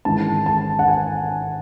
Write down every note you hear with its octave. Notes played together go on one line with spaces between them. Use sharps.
G#1 G#2 E3 G#3 C#4 A5
A5
F#5
G#5